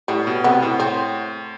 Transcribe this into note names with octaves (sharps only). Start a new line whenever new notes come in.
A2 G3
B2
C3 B3
A2
C4